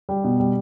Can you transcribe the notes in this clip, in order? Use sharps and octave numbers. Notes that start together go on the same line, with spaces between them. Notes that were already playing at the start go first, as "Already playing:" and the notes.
G3
B2
G3